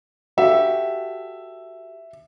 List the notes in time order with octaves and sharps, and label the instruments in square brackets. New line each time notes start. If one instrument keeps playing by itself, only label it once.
[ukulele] F#4 G4 A4 [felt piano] E5